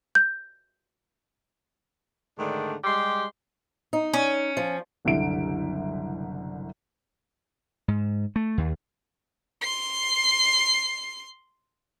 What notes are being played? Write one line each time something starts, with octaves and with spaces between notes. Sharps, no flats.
G6
G#2 D3 D#3 A3 D4
G3 G#3 G4 C6
D#4
C#4
F3
F#1 C2 D3 E5 D7
G#2
A3
D#2
C6 C7